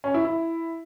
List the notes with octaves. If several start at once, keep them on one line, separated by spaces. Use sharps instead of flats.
C#4
E4
E4